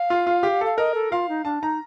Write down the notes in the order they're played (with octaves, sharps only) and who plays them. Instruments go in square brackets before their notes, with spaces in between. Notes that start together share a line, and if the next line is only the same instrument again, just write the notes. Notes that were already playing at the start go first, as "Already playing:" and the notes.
Already playing: [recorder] F5
[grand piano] F4
F4
G4
[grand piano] A4 [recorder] F5
[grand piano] A#4 [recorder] D#5
[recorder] A4
[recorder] F4 [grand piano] F5
[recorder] D#4
[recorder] D4 [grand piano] A5
[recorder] D#4 [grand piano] A#5